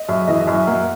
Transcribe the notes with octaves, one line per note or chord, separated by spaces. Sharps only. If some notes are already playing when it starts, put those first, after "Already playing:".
Already playing: D#5
F#2 E5
E3 D#5
D#5
F#2
E5
A#3 F#5